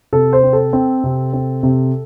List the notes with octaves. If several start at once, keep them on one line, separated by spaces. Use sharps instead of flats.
C3 A4
C5
C4
A4
C4
C3
C4
C3